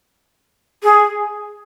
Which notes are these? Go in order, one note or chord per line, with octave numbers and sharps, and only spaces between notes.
G#4